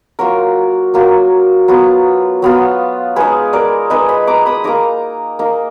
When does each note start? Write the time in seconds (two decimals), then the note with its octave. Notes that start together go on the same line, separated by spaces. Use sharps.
0.19 F#3 A#3 F4 F#4 A#4
0.94 F#3 A#3 F4
1.68 F#3 B3 F4
2.42 F#3 B3 F4
3.16 G#3 D#4 G#4 B4
3.53 A#4 D5
3.90 G#3 D#4 B4 D#5
4.09 G#5 B5
4.27 A#5 D6
4.46 B5 D#6
4.64 A#3 D#4 A#5 D6
5.39 A#3 D#4